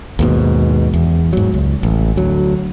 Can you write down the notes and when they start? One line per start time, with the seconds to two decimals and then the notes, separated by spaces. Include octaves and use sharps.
0.19 D#2 G#2 B2
0.94 E2
1.33 G#2 F#3
1.54 C#2
1.83 A1
2.16 D2 F#3